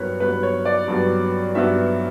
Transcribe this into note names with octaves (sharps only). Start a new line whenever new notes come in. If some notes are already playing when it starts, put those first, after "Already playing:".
Already playing: G2 F#3 B3 A#4 B4 C#5
G2 F#3 B3 B4
C#5
D5
G2 F#3 B3
G2 F#3 B3 E5